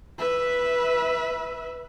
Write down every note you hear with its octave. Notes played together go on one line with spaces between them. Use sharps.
B4 E5